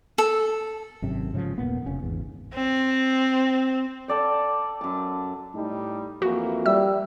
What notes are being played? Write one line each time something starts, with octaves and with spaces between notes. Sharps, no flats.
A4
G#1 F#2 C3
G#2 C#3 E3 F3
D#1 A#2 A#3 B3
F1 C#3 C#4
G#1 E2
C4
A4 D5 G5
F#2 A5
A2 G3 D#4
F2 E3 A#3 F#4
G3 E5 E6